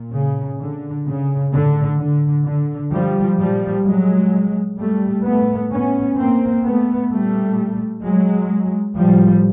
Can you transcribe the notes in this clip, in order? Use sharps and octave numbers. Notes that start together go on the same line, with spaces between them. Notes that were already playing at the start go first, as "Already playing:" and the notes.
Already playing: A#2
C#3
D3
C#3
A2 D3
D3
D3
F3 G3
A#2 F3 G3
F#3 G#3
G3 A3
A2 A3 B3
B3 C#4
A#3 C4
A3 B3
A#2 G3 A3
F#3 G#3
A2 F3 G3